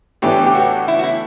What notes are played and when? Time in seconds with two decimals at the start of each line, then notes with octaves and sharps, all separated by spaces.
0.22 A2 E3 B3 D4 G4
0.46 G4
0.55 F#4
0.88 E4
0.99 F#4
1.03 E4